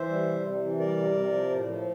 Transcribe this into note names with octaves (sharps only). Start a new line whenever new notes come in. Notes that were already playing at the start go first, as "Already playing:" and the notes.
Already playing: E3 C5 E5
G3
C3
C3
E3
G3 A#4 D5
C3
C3
F3
A2
F3